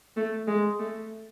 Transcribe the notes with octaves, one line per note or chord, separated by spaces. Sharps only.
A3
G#3
A3